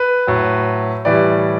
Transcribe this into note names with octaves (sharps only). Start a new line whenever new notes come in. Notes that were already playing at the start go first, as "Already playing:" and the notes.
Already playing: B4
A2 F#3
A2 E3 G3 D5